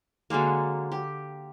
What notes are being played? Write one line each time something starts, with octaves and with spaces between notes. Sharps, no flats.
D3 F#3 G#3 A#3
G4